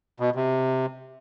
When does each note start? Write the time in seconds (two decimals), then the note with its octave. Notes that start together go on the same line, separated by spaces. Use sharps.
0.20 B2
0.35 C3